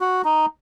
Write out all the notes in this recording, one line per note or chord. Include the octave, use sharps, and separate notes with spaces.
F#4
D#4